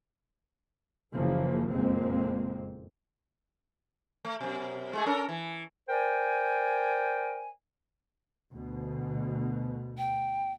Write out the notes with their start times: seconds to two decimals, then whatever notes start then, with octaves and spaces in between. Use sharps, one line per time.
1.13 F#1 C#3 E3 F3 A#3
1.71 F#1 F2 A#2 G#3 A#3 C4
4.25 A3
4.41 F#2 B2
4.93 G#3 A3 G#4
5.06 C#4 A4 A#4
5.29 E3
5.89 A#4 C5 D5 G5 G#5
8.53 D2 B2
9.98 G5